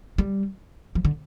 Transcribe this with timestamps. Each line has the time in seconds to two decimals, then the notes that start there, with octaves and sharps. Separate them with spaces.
0.18 G3
0.95 F3
1.05 D3